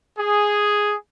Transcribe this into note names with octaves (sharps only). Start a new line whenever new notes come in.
G#4